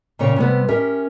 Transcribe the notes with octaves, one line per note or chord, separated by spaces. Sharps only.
A#2 C#3 C#5 G5
C3 G3 B3
C#4 G4 A#4 E5